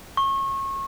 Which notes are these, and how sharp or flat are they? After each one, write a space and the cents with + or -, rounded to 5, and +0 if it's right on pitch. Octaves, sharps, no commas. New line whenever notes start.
C#6 -30